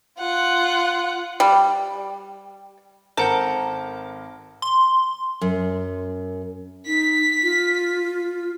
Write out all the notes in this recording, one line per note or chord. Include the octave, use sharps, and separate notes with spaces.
F4 F#5
G3
G#1 A4 A#4 C5 F#5 G6
C6
F#2
D#4 B6
F4